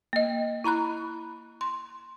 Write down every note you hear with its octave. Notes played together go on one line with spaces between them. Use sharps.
A#3 D#5
E4 A#5 B5 F#6
C6